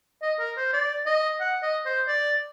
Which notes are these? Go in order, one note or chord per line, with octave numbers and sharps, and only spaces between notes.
D#5
A#4
C5
D5
D#5
F#5
D#5
C5
D5